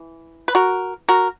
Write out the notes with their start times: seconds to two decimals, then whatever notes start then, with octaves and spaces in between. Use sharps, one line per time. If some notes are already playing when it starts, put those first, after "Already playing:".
Already playing: E3
0.48 B4
0.55 F#4 A#4
1.09 F#4 A#4